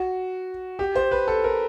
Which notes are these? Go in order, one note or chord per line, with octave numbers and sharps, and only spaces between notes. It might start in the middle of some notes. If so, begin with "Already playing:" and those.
Already playing: F#4
G4
C5
B4
A4
A#4